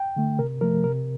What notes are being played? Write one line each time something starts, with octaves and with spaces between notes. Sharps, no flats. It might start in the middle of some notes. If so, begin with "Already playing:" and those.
Already playing: G5
D3 A3
C3 A#4
F3 A3 A#4
C3 A#4